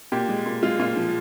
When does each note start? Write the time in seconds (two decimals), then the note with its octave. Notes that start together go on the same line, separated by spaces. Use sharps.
0.12 A#2 G4
0.29 G#3
0.46 A#2
0.63 G#3 F4
0.79 A#2 F4
0.96 F3